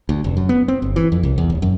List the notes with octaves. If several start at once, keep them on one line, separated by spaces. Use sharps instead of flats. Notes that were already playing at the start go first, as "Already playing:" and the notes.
D2
F1
F#2
B3
C4
G1
E3
F2
C2
E2
D#1
F#2